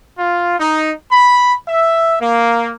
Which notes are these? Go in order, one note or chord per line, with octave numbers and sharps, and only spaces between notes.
F4
D#4
B5
E5
A#3